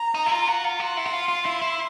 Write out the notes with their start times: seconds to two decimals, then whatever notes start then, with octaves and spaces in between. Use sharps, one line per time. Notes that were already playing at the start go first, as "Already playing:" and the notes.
Already playing: A#5
0.15 D#4
0.26 E4
0.31 F4
0.48 F#4
0.64 F4
0.80 F#4 C6
0.97 E4
1.05 F#4
1.13 F4
1.28 F4
1.45 E4
1.62 E4